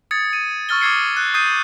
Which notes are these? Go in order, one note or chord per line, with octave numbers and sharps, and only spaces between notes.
D#6 G#6 A6 C#7
D#7
C#6 E6 F6 A6 G7
D6 D#6 G#6 C7 C#7
F#6
D#6 G6 C7 D#7